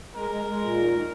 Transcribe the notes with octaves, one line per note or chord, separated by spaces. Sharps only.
G#3 A#4
G#3
G#3
A#2
D#3
D#3